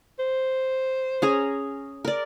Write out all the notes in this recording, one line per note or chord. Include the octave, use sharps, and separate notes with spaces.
C5
C#4 G#4 A#5
A#4 D5